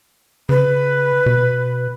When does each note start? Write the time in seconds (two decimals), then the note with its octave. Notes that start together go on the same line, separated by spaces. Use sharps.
0.49 C#3 B4
1.26 B2